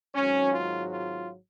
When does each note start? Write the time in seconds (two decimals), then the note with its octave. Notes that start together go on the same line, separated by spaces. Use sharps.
0.15 G#1 G#2 F#3 C#4
0.53 F4
0.91 F4